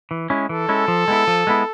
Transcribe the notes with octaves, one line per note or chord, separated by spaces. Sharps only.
E3
G#3 C#4 E4
E3 A4
G#3 C#4 E4
F3
G#3 B3 E4
F3
G#3 B3 E4